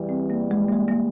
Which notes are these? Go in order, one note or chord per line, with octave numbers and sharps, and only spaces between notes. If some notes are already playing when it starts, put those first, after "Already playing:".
Already playing: E2 E3 G3
C4
A#3
G#3
A#3
G#3
A#3